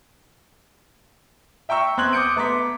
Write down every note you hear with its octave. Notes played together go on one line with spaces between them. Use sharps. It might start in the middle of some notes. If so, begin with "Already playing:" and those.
E5 G5 A#5 C#6 E6
E2 C4 C6 F#6 G#6 F#7
D6 D#6 G6 C#7 D7
A3 B3 A#5 C6 D6 B6